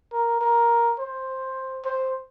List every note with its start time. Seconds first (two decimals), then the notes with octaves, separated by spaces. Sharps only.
0.12 A#4
0.41 A#4
0.99 C5
1.85 C5